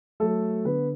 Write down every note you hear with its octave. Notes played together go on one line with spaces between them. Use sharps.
F#3 A3 A4
D3 B3 B4